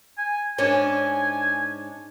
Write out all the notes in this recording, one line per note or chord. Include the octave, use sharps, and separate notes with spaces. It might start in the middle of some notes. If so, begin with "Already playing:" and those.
G#5
G#2 C#4 D4 G#5